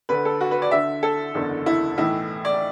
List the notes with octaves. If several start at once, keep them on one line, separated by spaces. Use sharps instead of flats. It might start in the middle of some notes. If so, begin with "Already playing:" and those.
D2 D3 B4
A4
F#4
B4
D5
D2 D3 E5
A4
F#1 E2 D3
E4
B1 A2 E3 E4
D5